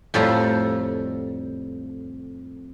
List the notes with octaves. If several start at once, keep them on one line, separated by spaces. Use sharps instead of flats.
F2 A2 G3 F4 A4 A#5